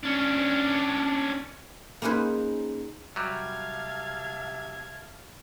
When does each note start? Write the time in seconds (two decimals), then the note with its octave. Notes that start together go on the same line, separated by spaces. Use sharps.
0.04 C#4 D4
2.02 A#3 C#4 D#4 G#4 B4 C5
3.16 C3 F#3 G3 F5 A5 G#6